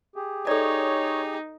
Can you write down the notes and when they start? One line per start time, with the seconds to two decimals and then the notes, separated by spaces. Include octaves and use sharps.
0.16 G4 G#4
0.47 D#4 A4 C#5 D5